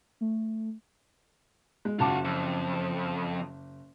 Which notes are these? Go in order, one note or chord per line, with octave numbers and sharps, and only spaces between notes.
A3
G#3
F#1 F4 F#4 A5 D6
F2